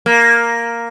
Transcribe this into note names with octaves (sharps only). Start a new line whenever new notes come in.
A#3